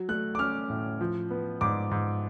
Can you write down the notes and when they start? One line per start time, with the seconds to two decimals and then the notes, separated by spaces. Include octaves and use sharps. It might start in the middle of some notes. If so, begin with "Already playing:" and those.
Already playing: F#3
0.09 A3 F#6
0.35 D6
0.39 C#4 F6
0.70 A2
1.01 F3
1.31 B3
1.61 G#2 D6
1.91 G#2